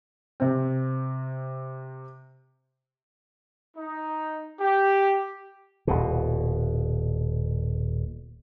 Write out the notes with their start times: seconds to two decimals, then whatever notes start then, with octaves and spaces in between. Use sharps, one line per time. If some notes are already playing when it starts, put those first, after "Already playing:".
0.40 C3 C4
3.77 D#4
4.60 G4
5.87 D#1 B2